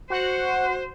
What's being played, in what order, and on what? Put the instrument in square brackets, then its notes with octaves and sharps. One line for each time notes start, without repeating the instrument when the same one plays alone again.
[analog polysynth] F#4 F#5 [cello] C5